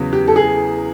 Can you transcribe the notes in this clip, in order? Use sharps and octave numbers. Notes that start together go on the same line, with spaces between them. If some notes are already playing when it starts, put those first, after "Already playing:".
Already playing: E2 C#3 F#3
G4
A4
G#4